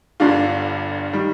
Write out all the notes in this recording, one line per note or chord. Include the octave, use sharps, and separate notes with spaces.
G1 G2 D3 D4 F4
D#3 G3